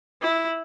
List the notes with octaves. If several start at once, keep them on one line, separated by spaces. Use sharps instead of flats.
E4